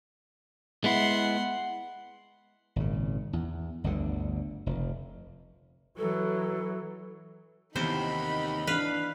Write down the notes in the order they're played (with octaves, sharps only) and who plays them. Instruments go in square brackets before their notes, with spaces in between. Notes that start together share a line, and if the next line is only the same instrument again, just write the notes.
[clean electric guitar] G#3 B3 E4 [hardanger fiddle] F#5 C6
[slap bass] G#1 A#2 C#3
E2
G1 D2 D3
F1 A2 F3
[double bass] E3 F#3 [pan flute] A4
[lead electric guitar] D#2 [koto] C3 C5 [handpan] E3 B3 [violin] D#4 B5
[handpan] E3 D4 [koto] B4 F5